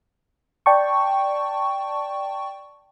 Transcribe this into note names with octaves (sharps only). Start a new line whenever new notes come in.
D5 G5 A5 C#6